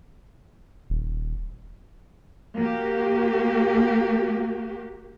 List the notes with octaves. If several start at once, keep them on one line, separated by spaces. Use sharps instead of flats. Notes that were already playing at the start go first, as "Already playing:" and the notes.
D#1
A#3 F#4 G4